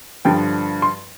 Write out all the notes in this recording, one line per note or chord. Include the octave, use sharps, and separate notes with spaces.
G2 D3 F3 G5
C6